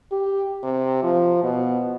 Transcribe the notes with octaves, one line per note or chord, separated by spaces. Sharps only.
G4
C3
F3
B2